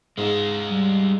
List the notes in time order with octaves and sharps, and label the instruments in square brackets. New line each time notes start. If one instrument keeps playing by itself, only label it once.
[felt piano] G#2 [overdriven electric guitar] G#3 F4
[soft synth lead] G3